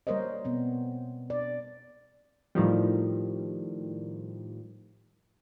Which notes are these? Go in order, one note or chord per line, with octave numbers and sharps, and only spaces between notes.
G3 A#3 A#4 C5 C#5 D#5
B2 B3 C4
D5
A2 D#3 F3 G3